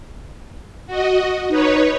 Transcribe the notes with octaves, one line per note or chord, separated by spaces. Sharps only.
F#4 D#5
D#4 B4 C#5